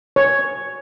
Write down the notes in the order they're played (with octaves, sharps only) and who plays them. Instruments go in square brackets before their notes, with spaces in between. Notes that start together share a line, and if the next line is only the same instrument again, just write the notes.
[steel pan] C#5